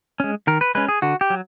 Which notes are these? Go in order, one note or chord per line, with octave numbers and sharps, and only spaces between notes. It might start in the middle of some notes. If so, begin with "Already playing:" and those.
G#3 C#4
D#3 A#4
B4
G#3 C#4 B4
G#4
D3 F#4
G4
F#3